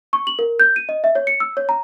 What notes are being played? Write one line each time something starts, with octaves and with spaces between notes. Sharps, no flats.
C#6
F#7
A#4
G6
D#7
D#5
E5
C#5
C#7
E6
C#5
A#5